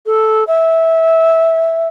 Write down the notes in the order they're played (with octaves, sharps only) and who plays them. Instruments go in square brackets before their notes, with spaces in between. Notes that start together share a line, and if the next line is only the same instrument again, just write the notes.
[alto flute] A4
E5